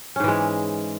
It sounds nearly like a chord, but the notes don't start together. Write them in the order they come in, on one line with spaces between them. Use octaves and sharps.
C#4 G#2 E3 G#3